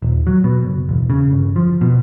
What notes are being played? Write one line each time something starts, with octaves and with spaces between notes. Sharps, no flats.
D#1
F#3
B2
F#1
E1
C#3
G1
F3
B2